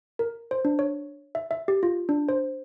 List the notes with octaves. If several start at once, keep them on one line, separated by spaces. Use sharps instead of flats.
A#4
C5
D4
C#5
E5
E5
G4
F4
D4
C5